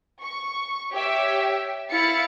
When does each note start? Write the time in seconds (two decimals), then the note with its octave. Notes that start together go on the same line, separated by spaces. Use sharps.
0.20 C#6
0.92 G4 C#5 E5
1.91 E4 F5 A6 C#7